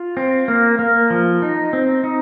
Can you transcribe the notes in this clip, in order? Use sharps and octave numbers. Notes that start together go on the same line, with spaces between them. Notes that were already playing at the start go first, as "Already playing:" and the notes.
Already playing: F4
C4
A#3
A#3
F3
D#4
C4
D#4